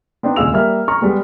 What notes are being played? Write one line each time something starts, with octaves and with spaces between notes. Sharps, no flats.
B3 C4 D4 D#4
D#1 C#2 G#4 F5 E6 F7
G3 A#3 E5 F6
A#5 C#6 F6
G3 G#3 B3 G4